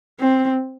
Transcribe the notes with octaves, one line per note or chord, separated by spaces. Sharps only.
C4